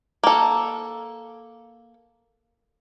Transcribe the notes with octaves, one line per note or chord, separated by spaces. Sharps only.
A#3 A4